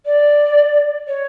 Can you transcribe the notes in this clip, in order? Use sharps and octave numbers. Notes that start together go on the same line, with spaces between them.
D5
C#5